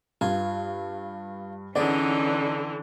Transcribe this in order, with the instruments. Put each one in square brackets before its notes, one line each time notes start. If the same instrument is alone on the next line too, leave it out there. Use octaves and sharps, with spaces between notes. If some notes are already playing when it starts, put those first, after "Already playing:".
[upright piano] G2 [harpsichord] F4 G#5
[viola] D3 E3 [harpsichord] B3 G#4 [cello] C#4 D#4 [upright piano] D5